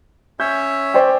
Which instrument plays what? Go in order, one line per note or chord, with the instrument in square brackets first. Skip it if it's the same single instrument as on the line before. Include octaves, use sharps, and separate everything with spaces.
[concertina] C#4 C#5 E5 [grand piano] G6
[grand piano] C5 D5 G5